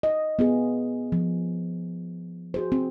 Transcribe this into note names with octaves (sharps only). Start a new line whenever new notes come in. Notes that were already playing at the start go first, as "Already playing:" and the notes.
D#5
B3 F4 G#4
F3
F#4 G#4 C5
C4